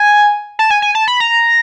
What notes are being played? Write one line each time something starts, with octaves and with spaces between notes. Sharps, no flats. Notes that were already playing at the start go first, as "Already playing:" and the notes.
Already playing: G#5
A5
G#5
G#5
A5
B5
A#5